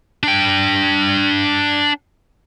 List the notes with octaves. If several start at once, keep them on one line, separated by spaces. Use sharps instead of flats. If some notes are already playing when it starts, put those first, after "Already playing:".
D4 G5